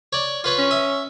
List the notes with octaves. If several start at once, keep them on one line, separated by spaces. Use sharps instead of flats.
C#5 D5
F4 B4 C#5
C#4
E5 D#6